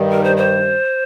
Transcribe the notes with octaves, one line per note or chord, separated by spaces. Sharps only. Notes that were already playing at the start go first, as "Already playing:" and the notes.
Already playing: G2 D#3 G3
A#4
C5
C5